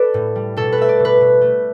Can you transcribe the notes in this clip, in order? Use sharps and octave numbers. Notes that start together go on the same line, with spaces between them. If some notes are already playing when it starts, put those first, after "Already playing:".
Already playing: A4 B4 D5
A2
G3
B2 A4
B4
A3 E5
D5
B2
B4
B2
A3